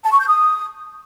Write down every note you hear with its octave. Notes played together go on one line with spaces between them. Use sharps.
A5
C#6
G6
D#6